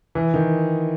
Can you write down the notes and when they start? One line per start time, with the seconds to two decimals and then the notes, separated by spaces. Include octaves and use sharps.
0.15 E3
0.34 D#3